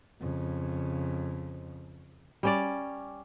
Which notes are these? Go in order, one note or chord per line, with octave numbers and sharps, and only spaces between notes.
F2 C#3
G3 C#4 D5